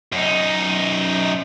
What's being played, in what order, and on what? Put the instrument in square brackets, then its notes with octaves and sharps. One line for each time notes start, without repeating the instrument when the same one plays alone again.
[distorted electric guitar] F#2 D#4